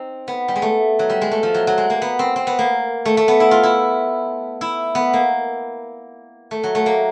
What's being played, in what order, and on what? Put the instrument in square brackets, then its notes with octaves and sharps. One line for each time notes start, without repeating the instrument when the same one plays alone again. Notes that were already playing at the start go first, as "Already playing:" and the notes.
Already playing: [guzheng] C4 D#4
B3
G3
G#3
A3
F#3
G3
G#3
A3
F3
F#3
F#3
G#3
A#3
B3
C4
C4
B3
A#3
A3
A3
B3
E4
F4
E4
E4
B3
A#3
A3
F#3
A3
A#3